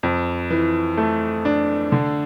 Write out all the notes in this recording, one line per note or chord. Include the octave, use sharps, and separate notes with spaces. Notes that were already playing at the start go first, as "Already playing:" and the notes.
F2
E3
A3
D4
D3